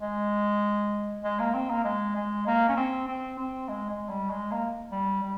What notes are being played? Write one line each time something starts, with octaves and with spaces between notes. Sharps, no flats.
G#3
G#3
A#3
C4
A#3
G#3
G#3
A#3
C#4
C4
C4
C4
G#3
G#3
G3
G#3
A#3
G3
G3